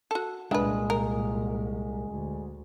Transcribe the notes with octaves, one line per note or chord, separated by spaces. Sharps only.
F#4 A4
C2 A#2 G#3 D4 B4
A#4
D2